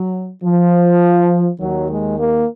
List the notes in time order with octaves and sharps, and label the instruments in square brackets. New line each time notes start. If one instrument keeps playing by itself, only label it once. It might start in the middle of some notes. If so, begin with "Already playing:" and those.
Already playing: [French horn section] F#3
F3
D#2 D#3 F#3
G#3
A#3